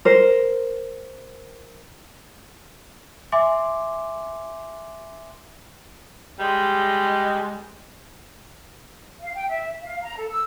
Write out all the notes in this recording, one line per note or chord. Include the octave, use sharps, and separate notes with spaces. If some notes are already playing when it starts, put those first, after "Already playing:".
A#4 C5
E5 G#5 C6 D6
G3 G#3
F5
G5
E5
F5
A#5
A4
E6